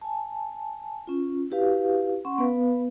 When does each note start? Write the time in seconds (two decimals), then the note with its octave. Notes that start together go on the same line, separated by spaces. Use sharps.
0.02 G#5 A5
1.07 C#4 F4
1.50 E4 F#4 G4 B4 F5
2.25 C#4 F#5 C6 C#6
2.38 B3 B4 F5